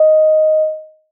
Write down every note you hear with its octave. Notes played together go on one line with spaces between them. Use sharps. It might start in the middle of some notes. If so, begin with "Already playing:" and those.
Already playing: D#5